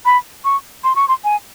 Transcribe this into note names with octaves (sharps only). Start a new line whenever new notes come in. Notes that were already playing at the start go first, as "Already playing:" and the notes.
B5
C#6
C6
C#6
C6
G#5